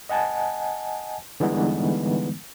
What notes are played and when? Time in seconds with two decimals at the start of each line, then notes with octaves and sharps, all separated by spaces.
0.09 D#5 F#5 G#5 A5
1.40 D3 E3 G3 G#3 B3 D#4